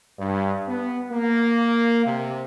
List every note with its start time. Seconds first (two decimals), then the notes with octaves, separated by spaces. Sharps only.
0.18 G2
0.68 B3
1.11 A#3
2.06 C3